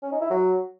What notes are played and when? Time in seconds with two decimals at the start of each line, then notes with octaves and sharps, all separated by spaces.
0.03 C#4
0.12 D#4
0.21 E4
0.31 F#3